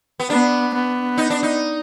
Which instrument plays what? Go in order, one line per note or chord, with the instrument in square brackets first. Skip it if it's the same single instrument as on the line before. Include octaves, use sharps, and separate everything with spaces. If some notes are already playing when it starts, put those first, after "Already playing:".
[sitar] B3
[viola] B3 [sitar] D4
[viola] B3
[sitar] D#4
D4
D#4